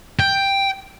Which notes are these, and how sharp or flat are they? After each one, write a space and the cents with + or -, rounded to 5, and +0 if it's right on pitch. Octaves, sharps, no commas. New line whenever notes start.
G5 +5